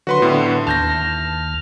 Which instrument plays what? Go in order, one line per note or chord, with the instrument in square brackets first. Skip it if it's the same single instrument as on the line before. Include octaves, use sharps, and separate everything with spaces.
[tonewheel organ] D3 F#3 [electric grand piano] F#4 B4 C6
[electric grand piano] A2 D3 [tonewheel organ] B3 E4
[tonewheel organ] D#2 F6 [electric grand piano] A5 G6 A#6